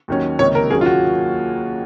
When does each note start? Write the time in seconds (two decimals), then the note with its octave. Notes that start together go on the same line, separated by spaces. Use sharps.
0.08 D#2 D#3 F#3 C#4
0.38 C#2 C3 D#3 A#3 C#5
0.55 A#4
0.70 D#2 D#3 F#3 A#3 C#4 G#4
0.81 F4
0.86 F#4